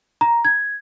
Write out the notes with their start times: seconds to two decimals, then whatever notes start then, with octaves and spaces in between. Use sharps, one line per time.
0.21 A#5
0.45 G#6